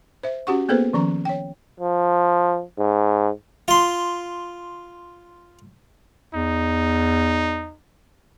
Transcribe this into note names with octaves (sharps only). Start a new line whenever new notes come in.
C5 E5
C#4 F#4 G4 F#5 C#6
A#3 B3 G#4 A4 B4 C5
D#3 F3 C#4 A#5
C#5 G5
F3
G#2
F4 C6
E2 D#4